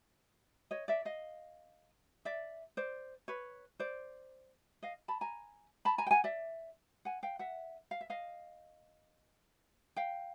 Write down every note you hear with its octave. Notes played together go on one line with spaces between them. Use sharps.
C#5 D#5
D5 E5
D#5 F5
D5 E5
C5 D5
B4 C#5
C5 D5
D#5 F5
A5 B5
G#5 A#5
A5 B5
G#5 A#5
G5
F#5 G#5
D5 E5
F#5 G#5
F5 G5
E5 F#5
F5
E5
D#5 F5
F5 G5